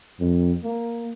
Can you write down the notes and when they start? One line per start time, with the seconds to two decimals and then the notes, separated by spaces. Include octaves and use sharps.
0.20 F2
0.64 A#3